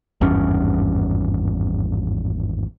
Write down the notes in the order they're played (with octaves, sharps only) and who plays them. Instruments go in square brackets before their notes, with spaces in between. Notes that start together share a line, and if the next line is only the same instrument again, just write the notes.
[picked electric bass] G#1 E2 G2 C#4